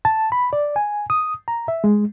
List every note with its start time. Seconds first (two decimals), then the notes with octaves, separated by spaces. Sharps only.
0.05 A5
0.32 B5
0.53 D5
0.76 G#5
1.10 D#6
1.48 A#5
1.68 E5
1.84 G#3